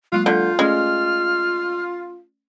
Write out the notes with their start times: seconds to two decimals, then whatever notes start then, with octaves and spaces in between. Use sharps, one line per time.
0.13 F#3 G#3 A#3 F4 F#6
0.26 D3 F4 G6
0.59 G#3 A3 C#4 D5 F6